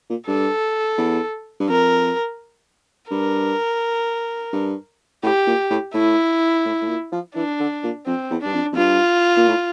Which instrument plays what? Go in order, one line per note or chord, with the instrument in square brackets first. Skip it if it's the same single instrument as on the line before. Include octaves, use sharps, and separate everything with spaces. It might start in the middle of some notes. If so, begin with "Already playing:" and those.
[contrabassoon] A#2
[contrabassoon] G2 [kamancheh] A4
[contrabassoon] E2
G2
[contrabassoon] F2 [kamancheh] A#4
[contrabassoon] G2 [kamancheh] A#4
[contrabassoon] G2
[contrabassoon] A2 [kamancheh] G4
[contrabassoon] A#2
A2
[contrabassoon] A2 [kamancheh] E4
[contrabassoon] A2
A2
A#2
F3
[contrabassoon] E3 [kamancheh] D4
[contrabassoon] D3
A#2
[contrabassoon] F2 [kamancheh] C4
[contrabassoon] E2
[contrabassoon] G2 [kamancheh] D4
[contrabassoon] F2
F2
[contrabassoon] G2 [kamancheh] F4
[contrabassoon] A#2
A2